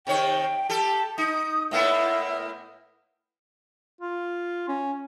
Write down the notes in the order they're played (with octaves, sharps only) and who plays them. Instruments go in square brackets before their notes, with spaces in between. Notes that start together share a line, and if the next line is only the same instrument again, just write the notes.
[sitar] C3 D#3 C#5 [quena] G5
[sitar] G4 A4 [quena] A5
[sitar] D#4 [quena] D#6
[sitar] A2 A#3 B3 [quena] E5
[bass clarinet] F4
C#4